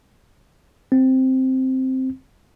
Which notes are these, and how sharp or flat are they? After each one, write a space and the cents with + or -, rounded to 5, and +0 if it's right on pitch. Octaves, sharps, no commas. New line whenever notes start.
C4 +0